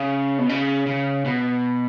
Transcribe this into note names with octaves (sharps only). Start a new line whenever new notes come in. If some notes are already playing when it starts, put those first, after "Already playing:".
Already playing: C#3
B2
C#3
C#3
B2